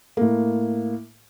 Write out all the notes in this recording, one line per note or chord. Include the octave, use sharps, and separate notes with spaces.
A2 A#3